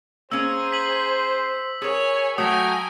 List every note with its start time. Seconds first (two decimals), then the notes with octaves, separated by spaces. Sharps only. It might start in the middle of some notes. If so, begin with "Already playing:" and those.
0.31 A#3 C#4 G#4 C5 A#5 E6
0.72 B6 F#7
1.82 G#4 A#4 C#5 G#5
2.38 F#3 A3 F#4 G5 G#5 A#5 D#6